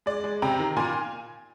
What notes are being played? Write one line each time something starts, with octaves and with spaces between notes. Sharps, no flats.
G#3 D5
G#3
C3 G5 A#5
D#3
A#2 G#5 C6